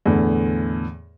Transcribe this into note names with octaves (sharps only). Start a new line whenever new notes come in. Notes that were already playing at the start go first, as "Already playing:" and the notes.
E2 A2 D3